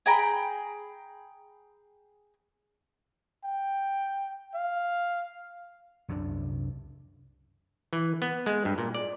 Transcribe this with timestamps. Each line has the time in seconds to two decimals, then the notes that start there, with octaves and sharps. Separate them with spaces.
0.06 G#4 G5 A#5 B5
3.44 G5
4.55 F5
6.08 C2 F#2 C3 D4
7.93 E3
8.22 B3
8.46 G#3
8.65 G2
8.78 A#2
8.95 D5